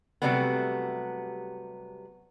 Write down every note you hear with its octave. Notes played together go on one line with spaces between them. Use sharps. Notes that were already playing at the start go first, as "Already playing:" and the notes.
C3 E3 F#3 G3 A3 B3